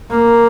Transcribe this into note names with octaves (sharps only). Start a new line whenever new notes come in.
A#3